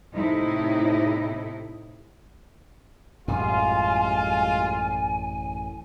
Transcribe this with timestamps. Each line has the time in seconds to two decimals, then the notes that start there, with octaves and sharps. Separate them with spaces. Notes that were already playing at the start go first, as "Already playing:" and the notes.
0.13 A2 C3 D#4 E4
3.28 A1 F#2 A2 G3 G#3 F4 G#5